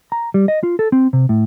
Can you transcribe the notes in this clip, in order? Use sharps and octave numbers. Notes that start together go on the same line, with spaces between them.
A#5
G3
D#5
F4
A4
C4
C3
A2